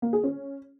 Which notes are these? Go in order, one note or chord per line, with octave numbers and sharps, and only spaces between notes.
A#3
G#4
C#4